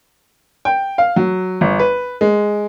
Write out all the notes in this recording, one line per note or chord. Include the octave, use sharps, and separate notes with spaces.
G5
F5
F#3
G1
B4
G#3